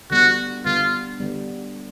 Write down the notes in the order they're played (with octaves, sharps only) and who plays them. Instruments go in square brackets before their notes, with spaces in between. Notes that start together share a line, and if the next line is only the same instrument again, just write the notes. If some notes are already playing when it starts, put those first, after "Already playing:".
[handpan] D3 G3 B3 [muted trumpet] F#4
[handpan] D3 G3 B3 [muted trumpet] F4
[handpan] D3 G3 B3